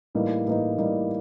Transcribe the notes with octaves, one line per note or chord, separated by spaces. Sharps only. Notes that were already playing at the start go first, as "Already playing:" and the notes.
A2 E3 G3 A#3 D#4
A2 E3 G3 A#3 D#4
A2 E3 G3 A#3 D#4